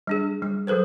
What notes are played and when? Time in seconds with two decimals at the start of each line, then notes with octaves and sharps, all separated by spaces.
0.07 G3 D4 G#4
0.42 G3
0.67 F#3 G#4 A4 B4 C5